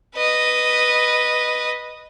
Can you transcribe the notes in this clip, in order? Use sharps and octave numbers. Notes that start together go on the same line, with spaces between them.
B4 D#5